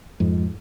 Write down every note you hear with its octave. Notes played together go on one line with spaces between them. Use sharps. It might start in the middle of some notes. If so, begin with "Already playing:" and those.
F2 G#2